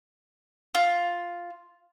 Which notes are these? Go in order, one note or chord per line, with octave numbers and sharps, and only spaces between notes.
F4